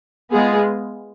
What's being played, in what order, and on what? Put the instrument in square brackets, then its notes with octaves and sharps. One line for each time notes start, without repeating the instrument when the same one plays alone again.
[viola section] G#3 B3 F4 G#4